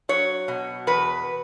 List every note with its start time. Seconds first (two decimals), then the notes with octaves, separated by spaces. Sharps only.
0.09 F#3 C#5
0.48 B2
0.87 E2 B4